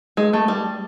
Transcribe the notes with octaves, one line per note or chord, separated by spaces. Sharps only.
G#3
A3
G3